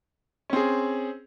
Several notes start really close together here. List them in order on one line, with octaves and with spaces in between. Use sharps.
C#4 C4 G#4